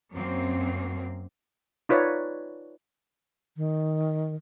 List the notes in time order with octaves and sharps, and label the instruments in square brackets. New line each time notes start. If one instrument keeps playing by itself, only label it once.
[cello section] F#2 A#3 C4
[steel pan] D#4 F4 B4 C#5 D5
[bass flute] D#3